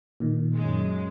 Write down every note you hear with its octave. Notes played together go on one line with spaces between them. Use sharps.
A#2 D#3
F#2 G#3